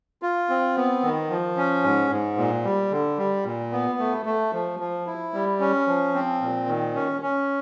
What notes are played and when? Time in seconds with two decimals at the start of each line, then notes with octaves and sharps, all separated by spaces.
0.22 F4
0.49 C4
0.76 B3
1.03 D#3
1.30 F3
1.57 C#4
1.84 G#2
2.11 G#2
2.38 A#2
2.64 G3
2.91 D3
3.18 G3
3.45 A#2
3.72 B3
3.99 A3
4.26 A3
4.53 F3
4.80 F3
5.07 E4
5.34 G3
5.60 C#4
5.87 F3
6.14 C4
6.41 A#2
6.67 D#3
6.95 C#4
7.22 C#4